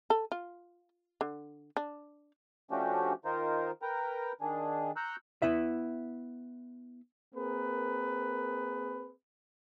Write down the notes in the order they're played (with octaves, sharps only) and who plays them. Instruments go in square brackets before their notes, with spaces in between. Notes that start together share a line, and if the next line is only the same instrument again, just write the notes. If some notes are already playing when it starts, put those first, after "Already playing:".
[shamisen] A4
F4
D3
D4
[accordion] F3 A3 C#4 D4 F#4 G4
D#3 D#4 F4 A#4 C5
A#4 B4 G5 A#5
D#3 D4 G#4
A#5 C#6 E6 F#6 G6
[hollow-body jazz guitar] B3 E4 E5
[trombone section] A#3 C4 G#4 A#4 B4